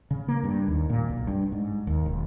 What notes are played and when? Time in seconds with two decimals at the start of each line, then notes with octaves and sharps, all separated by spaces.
0.11 C#3
0.28 A#3
0.44 G2
0.68 D#2
0.90 A#2
1.09 B1
1.27 G2
1.52 G#2
1.87 D#2
2.06 E1